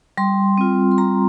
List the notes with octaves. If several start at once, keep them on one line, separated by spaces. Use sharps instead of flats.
G3 C6
C4 F4
C6
G3 A#5